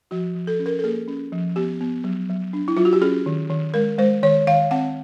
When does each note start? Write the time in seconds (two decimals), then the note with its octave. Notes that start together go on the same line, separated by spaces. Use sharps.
0.11 F3 F#4
0.35 F3
0.47 A4
0.59 C#4
0.66 A#4
0.79 A4
0.84 A#3 G#4
1.08 C#4
1.32 F3
1.56 B3 G4
1.81 B3
2.04 F#3
2.29 F#3
2.53 D4
2.68 E4
2.77 F#3 F4
2.85 F#4
2.93 G4
3.01 C#4 G#4
3.26 D#3
3.50 D#3
3.74 G#3 A#4
3.98 G#3 C5
4.23 D#3 C#5
4.47 D#3 F5
4.71 C4 F#5